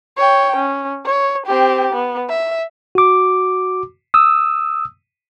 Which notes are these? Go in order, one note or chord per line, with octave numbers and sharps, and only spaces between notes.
C#5 G5
C#4
C#5
C4 G4
B3
E5
F#4 D6
D#6 E6